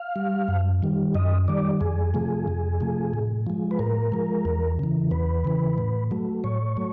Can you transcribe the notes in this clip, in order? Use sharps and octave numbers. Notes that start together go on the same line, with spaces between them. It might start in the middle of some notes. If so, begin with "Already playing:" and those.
Already playing: F5
G3
F#2
D#3 G3
F#2 D#5
D#3 G3 D5
F2 G#4
C3 F3 A3
F2
C3 F3 A3
A2
F3 G#3
B4
A2 A#4
F3 G#3
E2
C#3 E3
E2 B4
C#3 E3
A2
F#3 A3
A2 C#5
F#3 A3